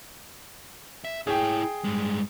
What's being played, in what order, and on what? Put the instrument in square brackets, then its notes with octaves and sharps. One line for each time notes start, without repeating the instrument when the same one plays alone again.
[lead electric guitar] E5
[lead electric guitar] E4 C#5 [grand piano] G#4 G5
[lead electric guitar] G2 G#3